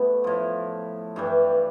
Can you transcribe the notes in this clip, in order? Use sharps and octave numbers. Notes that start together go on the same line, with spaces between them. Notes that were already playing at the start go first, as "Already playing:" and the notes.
Already playing: G2 A3 B3
A2 F3
G2 E3 G3